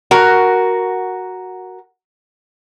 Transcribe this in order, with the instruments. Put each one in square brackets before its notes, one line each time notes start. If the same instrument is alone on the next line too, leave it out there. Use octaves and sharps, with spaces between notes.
[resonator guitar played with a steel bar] F#4 A#4